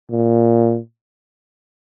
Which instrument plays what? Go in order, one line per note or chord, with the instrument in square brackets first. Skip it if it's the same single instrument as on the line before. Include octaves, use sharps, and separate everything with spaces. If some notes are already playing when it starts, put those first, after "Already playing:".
[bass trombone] A#2